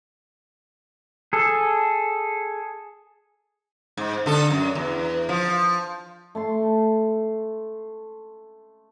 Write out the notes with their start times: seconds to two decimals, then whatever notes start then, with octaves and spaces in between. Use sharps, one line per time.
1.33 G#4 A4
3.97 G#2
4.26 D3 A4
4.50 F#2
4.75 E2
5.29 F3
6.35 A3 A5 C6